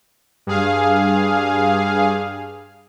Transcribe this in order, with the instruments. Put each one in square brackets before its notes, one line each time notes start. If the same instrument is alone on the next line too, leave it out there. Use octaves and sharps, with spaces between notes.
[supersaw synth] G2 G#4 F5